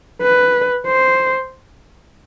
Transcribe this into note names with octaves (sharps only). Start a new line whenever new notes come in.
B4
C5